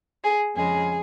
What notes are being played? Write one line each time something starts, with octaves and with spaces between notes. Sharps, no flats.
G#4
F2 C#3 G#3 G#4